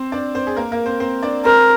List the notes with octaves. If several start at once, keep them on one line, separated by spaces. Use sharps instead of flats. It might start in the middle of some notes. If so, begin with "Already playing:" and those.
Already playing: C4 C5
D4 D5
C4 C5
G#4
A#3 A#4
A#3 A#4
C4 C5
C4 C5
D4 D5
C4 A#4 C5